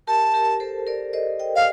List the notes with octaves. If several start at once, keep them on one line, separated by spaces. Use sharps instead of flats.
G4 A#4 A5
G4 A#4
A4 C5
A#4 D5
C5 D#5
D#5 G5
F5